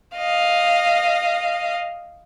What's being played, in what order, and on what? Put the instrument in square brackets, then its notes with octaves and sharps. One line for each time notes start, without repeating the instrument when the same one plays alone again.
[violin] D#5 F5